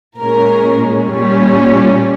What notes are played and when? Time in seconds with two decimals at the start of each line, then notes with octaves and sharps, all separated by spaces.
0.19 A#2 G#3 C#4 A#4
1.13 A#2 G3 C#4